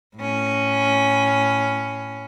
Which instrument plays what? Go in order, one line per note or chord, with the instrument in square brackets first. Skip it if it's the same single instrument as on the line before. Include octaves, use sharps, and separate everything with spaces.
[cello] A2 C#4